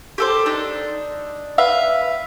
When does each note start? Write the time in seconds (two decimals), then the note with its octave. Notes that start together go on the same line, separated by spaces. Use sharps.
0.18 G4 A4 C5
0.46 D4 D#4
1.58 B4 E5 F5